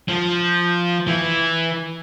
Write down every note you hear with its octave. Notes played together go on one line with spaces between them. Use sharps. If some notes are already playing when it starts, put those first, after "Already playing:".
F3
E3